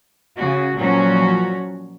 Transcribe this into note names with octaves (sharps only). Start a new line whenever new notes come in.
C#3 F#4
A#2 F3 F#3 C#4 F#4